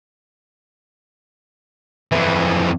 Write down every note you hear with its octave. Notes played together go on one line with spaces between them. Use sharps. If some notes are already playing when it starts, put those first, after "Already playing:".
F2 E3